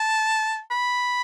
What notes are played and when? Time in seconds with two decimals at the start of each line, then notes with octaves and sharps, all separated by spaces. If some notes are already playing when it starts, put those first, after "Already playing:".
Already playing: A5
0.71 B5